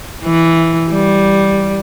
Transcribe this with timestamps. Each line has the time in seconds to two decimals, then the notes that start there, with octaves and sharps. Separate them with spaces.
0.24 E3
0.90 G3